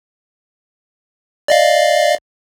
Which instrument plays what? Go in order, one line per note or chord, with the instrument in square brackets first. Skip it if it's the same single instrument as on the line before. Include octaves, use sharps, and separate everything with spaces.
[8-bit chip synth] D5 D#5 F5